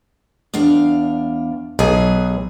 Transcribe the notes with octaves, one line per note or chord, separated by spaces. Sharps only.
E2 D4 F5
B1 G#4 B4